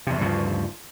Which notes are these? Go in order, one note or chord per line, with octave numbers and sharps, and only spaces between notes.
E2 C3
D2 G2 C#3 F3